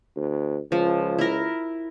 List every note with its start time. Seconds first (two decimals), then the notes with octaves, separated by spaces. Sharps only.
0.17 D2
0.72 C#2 F3
1.19 E4 A#4